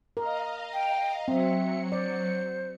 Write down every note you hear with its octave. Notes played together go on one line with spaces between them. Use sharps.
A#4 D#5 F5 A#5
G5
F#3 C4 E5 C#7
C5 D5